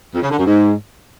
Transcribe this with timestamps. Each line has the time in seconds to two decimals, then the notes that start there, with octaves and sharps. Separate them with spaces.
0.15 F2
0.22 C#3
0.30 D3
0.38 F#2
0.46 G#2